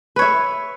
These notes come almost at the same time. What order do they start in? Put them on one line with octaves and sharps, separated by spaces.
B4 C#5 E5